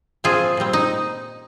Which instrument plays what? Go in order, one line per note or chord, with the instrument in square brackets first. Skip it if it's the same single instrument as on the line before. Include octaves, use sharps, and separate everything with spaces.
[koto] A#2 F3 C4 F4 G#4
A#2 G3 C4
D#4